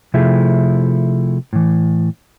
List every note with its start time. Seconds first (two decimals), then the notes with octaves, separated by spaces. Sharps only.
0.14 C3 F3 A3 E4 G#4
1.53 A2 E3